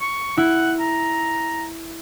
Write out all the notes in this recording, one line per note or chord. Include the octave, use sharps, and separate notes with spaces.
C#6
E4 F#5
A#5